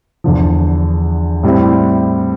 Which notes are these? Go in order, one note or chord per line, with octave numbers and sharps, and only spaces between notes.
E2 D3 F3
A2 G3 C4 E4